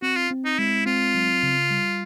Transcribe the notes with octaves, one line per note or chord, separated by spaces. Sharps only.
C4 F#4
F4
C4
D#4
G#3 E4
C4 F4
F#3
C#3
G3